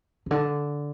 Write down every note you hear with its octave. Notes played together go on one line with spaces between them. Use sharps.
C3
D3